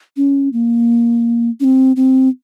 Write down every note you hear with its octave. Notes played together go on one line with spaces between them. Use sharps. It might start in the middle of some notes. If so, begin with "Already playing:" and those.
C#4
A#3
C#4
C4
C4